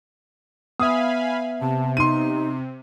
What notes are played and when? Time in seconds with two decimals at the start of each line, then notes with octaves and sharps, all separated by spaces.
0.80 B3 E5 F5 G#5 B5 D#6
1.61 C3 A5
1.97 D#4 C6 D#7